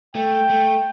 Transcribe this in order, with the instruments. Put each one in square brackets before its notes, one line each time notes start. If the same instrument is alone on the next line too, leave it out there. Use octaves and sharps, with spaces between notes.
[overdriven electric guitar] A3 [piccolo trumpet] G5
[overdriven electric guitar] A3